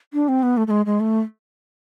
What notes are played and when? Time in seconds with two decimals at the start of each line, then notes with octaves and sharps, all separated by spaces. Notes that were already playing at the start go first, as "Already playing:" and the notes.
0.13 D4
0.28 C4
0.43 B3
0.57 A3
0.67 A3
0.70 G#3
0.86 G#3
1.00 A3